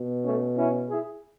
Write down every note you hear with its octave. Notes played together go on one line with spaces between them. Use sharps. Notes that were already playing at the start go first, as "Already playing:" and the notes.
Already playing: B2
A3 C#4
C#4 E4
E4 G#4